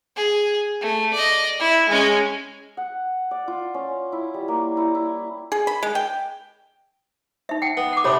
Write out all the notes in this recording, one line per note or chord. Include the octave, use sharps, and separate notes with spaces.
G#4
A3
D5 D#5
E4
G#3 C#4
F#5
D5
F4
C#4
E4
G3
A#3
E4
E4
G#4
B5
G#3
G5
D#4 E5
F#5 G5
B3
F#5 D6
C3 D4 A4 C#5 B5